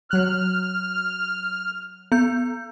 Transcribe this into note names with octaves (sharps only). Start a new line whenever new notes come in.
F#3 F6 F#6
B3 G6